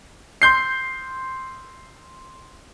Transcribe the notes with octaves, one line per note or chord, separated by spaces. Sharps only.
C6 G6 C7